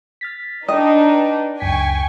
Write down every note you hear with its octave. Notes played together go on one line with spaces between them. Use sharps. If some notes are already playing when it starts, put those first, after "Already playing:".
F6 A6 B6
D4 D#4 B4 D#5 G5
C#2 F#2 G5 G#5 C#6 B6